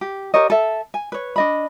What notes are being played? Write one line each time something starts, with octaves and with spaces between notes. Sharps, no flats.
G4
G4 A#4 C#5 D#5
A4 E5
G#5
B4 C#5
D4 D#5 B5